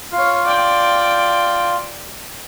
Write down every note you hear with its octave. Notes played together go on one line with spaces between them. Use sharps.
F4 C#5 F5
D5 G5